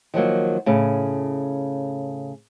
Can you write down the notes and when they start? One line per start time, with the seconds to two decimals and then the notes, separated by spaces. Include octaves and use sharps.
0.14 D#3 F3 F#3 A#3
0.66 A2 C#3